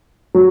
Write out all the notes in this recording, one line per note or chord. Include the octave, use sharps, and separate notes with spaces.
F#3